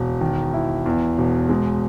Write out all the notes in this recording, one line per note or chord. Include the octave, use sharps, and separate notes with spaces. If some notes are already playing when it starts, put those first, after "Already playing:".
Already playing: E1
D#3
E4
E2
E1
G#3